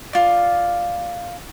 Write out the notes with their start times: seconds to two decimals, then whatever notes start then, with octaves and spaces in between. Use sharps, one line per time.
0.13 F4 D5